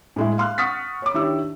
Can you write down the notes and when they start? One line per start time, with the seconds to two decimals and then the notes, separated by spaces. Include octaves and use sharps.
0.16 A2 G#3 E4
0.38 F5 C6 F6 F#6
0.58 F#5 C#6 D#6 F6 A6 B6
1.02 C#5 D6
1.14 D#3 D4 E4 G4 C#5 E6